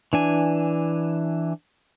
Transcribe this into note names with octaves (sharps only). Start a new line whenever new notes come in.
E3 D4 G#5